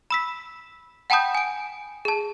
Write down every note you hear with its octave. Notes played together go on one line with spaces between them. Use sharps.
B5 E6 B6
F#5 G5 A5 B5 D#6 G6
G#5 D7
G#4 A5